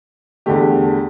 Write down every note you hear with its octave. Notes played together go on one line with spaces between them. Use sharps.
E2 D3 A3 G4